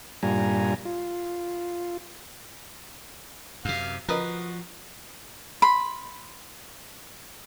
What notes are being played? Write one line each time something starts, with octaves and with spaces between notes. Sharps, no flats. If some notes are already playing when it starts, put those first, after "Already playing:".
G2 A#2 G3 F4 G#5 A#5
F4
F#2 C3 F5
F3 F#4 A#4 B4 D#5
B5 C6